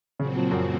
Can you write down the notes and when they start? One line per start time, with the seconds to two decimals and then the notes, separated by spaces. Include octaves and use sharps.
0.19 A#2 C#3 F#3 C4 F#4
0.35 F3
0.51 F#2